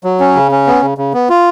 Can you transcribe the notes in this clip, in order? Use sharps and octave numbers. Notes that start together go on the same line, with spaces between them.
F#3
C#4
C#3
C#4
B3
C#3
C#3
B3
F4